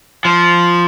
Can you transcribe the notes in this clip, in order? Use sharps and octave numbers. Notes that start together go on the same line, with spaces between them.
F3